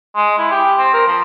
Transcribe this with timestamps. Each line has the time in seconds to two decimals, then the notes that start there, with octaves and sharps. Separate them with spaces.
0.16 G#3
0.38 E4
0.51 G4
0.78 C4
0.93 A#4
1.07 F3